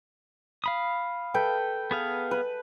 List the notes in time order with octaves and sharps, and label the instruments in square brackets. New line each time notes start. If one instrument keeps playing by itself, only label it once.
[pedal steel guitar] F5 B5 D#6
[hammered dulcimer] A4 B4 G5
[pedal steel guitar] B3 G#4 F5
[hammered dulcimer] B4